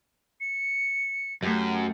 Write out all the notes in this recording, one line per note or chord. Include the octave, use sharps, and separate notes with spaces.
C#7
F#2 A3 F#4 G4